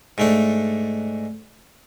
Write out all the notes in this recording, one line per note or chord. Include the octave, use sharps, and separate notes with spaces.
G#2 A3 D4